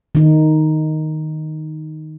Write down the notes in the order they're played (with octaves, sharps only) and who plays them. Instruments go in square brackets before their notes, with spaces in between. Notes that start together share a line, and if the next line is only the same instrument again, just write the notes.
[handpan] D#3 D#4